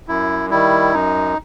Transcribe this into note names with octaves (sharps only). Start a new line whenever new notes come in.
F#2 E4
D#3 G3 E4
F#2 D#4